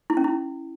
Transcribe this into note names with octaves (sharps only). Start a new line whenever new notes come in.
E4
C#4
E4